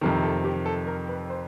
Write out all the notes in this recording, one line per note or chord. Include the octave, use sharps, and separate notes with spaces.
F2 C3 D#3 A4
A4
G4
A4
A#4
B4
C5